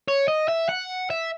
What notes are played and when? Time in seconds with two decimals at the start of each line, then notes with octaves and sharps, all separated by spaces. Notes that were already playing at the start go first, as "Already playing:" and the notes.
0.08 C#5
0.28 D#5
0.48 E5
0.69 F#5
1.10 E5